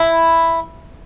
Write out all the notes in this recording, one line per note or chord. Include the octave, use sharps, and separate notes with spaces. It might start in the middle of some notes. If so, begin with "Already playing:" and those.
Already playing: E4